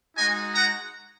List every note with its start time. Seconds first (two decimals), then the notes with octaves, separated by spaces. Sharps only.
0.17 G#3 D#4 F#4 D#5 G#5
0.54 F#5 A#5